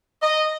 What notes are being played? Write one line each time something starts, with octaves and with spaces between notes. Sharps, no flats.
D#5